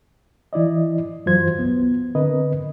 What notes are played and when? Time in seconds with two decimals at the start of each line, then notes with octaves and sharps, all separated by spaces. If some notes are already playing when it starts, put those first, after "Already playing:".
0.53 E3 E4 D5 D#5
1.26 F#2 E3 F#3 F4 C5 G#6
1.58 C2 B3
2.15 D3 C4 A#4 B4 D#5